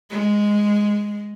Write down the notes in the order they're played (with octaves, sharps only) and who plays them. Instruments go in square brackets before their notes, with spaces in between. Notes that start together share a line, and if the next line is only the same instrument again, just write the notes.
[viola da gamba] G#3